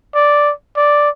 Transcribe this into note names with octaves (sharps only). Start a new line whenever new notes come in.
D5
D5